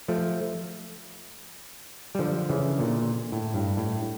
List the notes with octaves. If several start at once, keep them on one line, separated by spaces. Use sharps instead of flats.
F3 A3
G3
D3 F3
C#3 E3
A#2 D3
A2
G2
A2